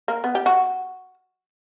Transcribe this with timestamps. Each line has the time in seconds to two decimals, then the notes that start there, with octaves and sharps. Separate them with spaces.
0.08 A#3
0.24 B3
0.35 G4
0.46 F#4